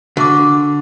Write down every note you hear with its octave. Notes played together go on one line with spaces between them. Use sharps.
D3 F#4 C#6 D6